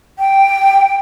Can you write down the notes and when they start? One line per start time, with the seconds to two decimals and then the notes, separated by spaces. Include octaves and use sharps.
0.19 G5